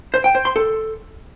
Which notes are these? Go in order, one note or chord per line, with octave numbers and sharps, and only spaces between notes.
C5
G5
C5
C6
A4